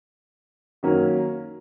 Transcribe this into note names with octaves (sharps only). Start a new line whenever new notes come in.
D#3 F#3 A#3 C#4